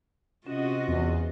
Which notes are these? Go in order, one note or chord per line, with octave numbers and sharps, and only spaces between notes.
C3 C#4 F4 F#4 D#5
E2